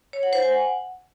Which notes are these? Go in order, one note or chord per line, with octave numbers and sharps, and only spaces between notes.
C#5
F#5
C5
G#5
F#5